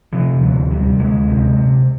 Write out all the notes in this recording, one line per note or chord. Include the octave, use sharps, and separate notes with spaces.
C3 F3
D2 F3
C3 G3
D2 G#3
C3
C3